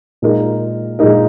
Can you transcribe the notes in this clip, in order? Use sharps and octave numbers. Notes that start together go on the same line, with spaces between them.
A#2 G#3 D#4 A#4
A#2 G#3 D#4 A#4